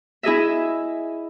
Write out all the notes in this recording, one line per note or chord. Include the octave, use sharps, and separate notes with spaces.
E4 G#4 D#5 E5